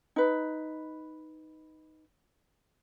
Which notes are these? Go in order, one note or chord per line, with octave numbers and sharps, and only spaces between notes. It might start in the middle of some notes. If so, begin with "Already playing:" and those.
D#4 B4